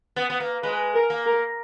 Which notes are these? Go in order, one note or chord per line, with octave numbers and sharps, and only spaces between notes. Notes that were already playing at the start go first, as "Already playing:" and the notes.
B3
B3
A#3
G#3 B4
A#4
A#3
A#4